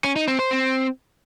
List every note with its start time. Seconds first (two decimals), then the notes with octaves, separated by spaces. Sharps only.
0.04 C#4
0.16 D#4
0.28 C4
0.39 C5
0.51 C4